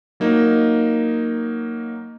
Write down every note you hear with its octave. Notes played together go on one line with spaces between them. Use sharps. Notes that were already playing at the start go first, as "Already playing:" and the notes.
F#3 A#3 D#4